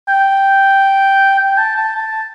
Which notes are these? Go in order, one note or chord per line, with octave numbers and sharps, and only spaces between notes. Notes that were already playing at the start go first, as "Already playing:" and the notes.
G5
G5
A5
A5
A5